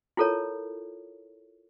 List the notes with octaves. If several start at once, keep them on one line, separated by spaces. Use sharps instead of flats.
E4 F4 A4 A#4 C#5